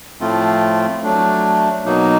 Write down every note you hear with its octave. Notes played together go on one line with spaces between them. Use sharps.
A2 F3 A3 C4 F4
F#3 A3 D4
B2 F#3 A#3 D#4